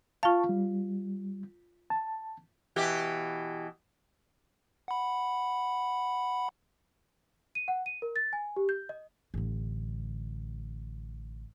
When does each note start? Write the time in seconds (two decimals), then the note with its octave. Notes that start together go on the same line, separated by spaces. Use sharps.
0.23 F4 F5 A5 C#6
0.49 G3
1.90 A5
2.76 B2 E3 G4
4.88 F#5 B5
7.55 D#7
7.68 F#5
7.86 D#7
8.02 A#4
8.16 A6
8.33 G#5
8.56 G4
8.69 G6
8.89 D#5
9.34 A1 D3